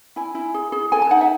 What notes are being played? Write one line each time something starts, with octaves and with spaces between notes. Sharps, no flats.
E4 G#5
E4
G#4
G#4
A4 G#5
A5
D#4 F#5
E5